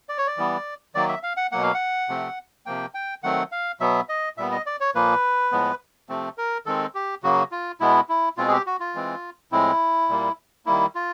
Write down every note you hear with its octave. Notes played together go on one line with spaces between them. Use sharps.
D5
C#5
D5
E3 G3 B3
D#3 F#3 A#3 D5
E5
F5
F#5
B2 F#3 A#3 F#5
F5
F#5
C3 F3 A3 C4
C3 F3 A#3 G5
G5
D#3 F#3 A3 C4 F#5
F5
B2 F#3 B3 E5
D#5
A#2 G3 B3 E5
D#5
D5
C#5
A#2 F3 A#3 B4
A2 F3 G#3 B3
C3 F3 A3 C4
A#4
D#3 G#3 C4 A4
G4
C#3 F#3 A#3 F#4
F4
B2 G#3 B3 E4
E4
B2 G#3 C4 F4
G#4
G4
F#4
F4
E3 G#3 C4
A2 F3 G#3 C4 E4
A#2 G3 A#3
D#3 G3 A#3 E4
F4